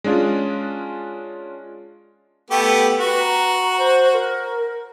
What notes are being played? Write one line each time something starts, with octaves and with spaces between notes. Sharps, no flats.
G#3 C#4 D4 F4
A3 B3 G4 G5
F#4 B4
A#5
C5
A#4